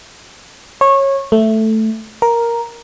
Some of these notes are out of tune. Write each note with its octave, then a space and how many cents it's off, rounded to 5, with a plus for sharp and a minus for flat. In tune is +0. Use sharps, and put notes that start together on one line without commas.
C#5 -20
A3 +0
A#4 +5